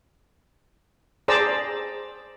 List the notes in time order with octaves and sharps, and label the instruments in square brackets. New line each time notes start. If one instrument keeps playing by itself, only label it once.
[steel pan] G#4 C5 D5 A5 A#5 E6